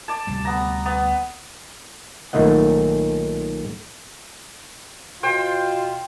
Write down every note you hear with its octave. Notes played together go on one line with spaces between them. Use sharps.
D5 A5
D2 C3 G3
B3 A#5
B3
B1 A#2 D#3 A3 D#5 F#5
B2 F4 C5 G5